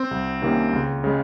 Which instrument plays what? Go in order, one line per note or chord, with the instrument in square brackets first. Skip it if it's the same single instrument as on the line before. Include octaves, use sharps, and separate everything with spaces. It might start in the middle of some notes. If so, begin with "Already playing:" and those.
Already playing: [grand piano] C4
[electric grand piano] C2
C3 D#3 A#3 C#4
C#2
C#3 G#3